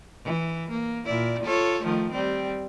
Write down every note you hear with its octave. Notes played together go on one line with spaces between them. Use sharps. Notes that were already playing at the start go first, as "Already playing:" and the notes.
E3
A#3
A#2 E4 D5
F4 A4 C#5
D#3 F3 A3
G3 C4